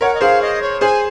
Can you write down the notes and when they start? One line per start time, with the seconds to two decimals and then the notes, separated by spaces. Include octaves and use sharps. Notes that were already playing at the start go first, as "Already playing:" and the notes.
0.01 A#4 C#5 F#5
0.14 D#5
0.21 G#4 C5 F5
0.41 D#5
0.61 C#5
0.81 G#4 C5 G#5